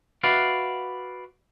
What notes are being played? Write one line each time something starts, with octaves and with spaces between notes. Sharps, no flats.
F#4 B4 D5 E5 F5